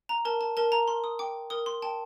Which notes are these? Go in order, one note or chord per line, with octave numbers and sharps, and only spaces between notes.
A#5
A#4 A5
A5
A#4 A5
A#5
A#4 C6
D#6
G5 D6
A#4 D#6
C6
G5 A5